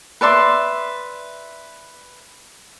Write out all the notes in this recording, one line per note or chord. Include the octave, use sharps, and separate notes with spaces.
B4 D5 E5 C6